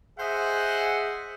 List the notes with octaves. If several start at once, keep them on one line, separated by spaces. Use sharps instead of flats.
G#4 C5 D#5 E5 F#5